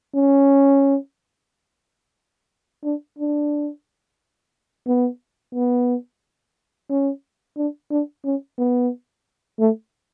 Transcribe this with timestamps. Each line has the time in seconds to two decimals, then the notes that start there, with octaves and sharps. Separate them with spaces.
0.15 C#4
2.84 D4
3.19 D4
4.87 B3
5.54 B3
6.90 C#4
7.57 D4
7.91 D4
8.25 C#4
8.58 B3
9.60 A3